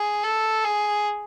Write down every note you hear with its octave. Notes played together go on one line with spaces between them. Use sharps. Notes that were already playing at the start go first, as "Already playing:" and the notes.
Already playing: G#4
A4
G#4